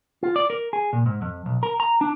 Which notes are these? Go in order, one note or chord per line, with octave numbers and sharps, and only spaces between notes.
F4
D5
A#4
G#4
A#2
G#2
F2
B1
A#4
A#5
D4